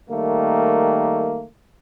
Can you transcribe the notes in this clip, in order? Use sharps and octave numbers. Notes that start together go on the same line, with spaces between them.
D#3 G3 A3 A#3